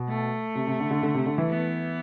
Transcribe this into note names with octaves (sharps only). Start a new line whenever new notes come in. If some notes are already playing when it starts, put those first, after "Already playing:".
Already playing: B2
A3
C3
C3
D3
D3
D3
C3
D3
E3
B3